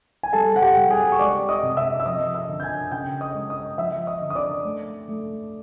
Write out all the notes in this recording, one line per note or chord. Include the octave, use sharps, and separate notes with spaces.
G#5
G3 A4 A5
F#5
G4 G5
G3
G#4 G#5
C#6
G#3 D5 D6
D#5 D#6
C3
E5 E6
E6
F3 D#5 D#6
E5 E6
D3
G6
G#5 G#6
C#3 G5 G6
D#5 D#6
G#3
D#5 D#6
F3 E5 E6
D#5 D#6
D3
D#6
D5 D6
A3
A3